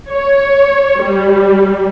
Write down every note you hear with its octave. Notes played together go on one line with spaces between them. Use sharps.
C#5
G3